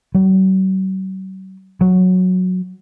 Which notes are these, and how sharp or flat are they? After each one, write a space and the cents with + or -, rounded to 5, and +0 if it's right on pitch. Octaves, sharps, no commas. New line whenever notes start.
F#3 +45
F#3 -10